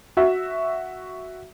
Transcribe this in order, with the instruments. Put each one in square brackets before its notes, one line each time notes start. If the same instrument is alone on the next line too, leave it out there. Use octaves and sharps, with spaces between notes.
[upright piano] F#4 E5